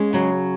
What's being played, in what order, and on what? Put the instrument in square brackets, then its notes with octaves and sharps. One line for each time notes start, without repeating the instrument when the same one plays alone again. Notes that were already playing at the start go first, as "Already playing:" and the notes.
Already playing: [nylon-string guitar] G#3 C#4
C#3 F#3